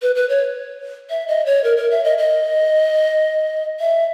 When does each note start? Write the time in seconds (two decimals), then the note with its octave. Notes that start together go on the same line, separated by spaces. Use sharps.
0.02 B4
0.15 B4
0.29 C#5
1.10 E5
1.28 D#5
1.46 C#5
1.64 A#4
1.77 A#4
1.91 E5
2.04 D#5
2.18 D#5
3.80 E5